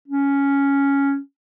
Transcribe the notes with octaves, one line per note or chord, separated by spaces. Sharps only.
C#4